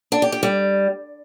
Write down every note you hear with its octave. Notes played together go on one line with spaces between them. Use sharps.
D4
G4
G4
G3